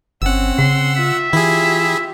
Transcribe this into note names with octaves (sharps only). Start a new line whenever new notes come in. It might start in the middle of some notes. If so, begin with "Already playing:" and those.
G1 C4 C#4 F#5 E6
C#3 C6
F4 E5
E3 E4 F4 G4 G#4